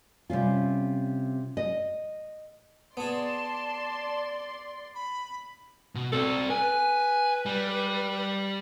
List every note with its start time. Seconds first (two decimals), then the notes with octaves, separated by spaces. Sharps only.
0.30 C3 G3 C#4 F4
1.57 D#5
2.97 B3 G#4 D5 A5 C6
4.95 B5
5.95 B2
6.13 C4 A4 D5
6.50 B4 G#5
7.46 G3